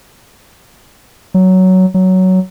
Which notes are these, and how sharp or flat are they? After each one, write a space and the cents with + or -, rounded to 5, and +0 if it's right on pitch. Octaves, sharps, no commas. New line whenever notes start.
F#3 +10
F#3 +10